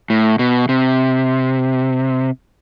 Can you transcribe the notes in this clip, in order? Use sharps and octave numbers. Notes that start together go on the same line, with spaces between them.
A2
B2
C3